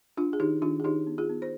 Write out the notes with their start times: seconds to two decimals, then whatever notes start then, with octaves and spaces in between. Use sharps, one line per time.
0.17 D4 F4
0.33 G#4
0.40 D#3 D#4 G4
0.62 D#3 D4 F4
0.80 G#4
0.84 D#3 D#4 G4
1.07 B3
1.18 F4 G#4
1.29 B3
1.42 C5